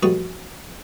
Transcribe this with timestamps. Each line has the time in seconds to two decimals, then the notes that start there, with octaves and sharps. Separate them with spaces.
0.03 A#1 E2 G3 A3 F#4 D#6